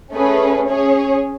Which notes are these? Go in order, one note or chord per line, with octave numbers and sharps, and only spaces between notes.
A3 C#4 G#4 B4
C#4 G#4 C#5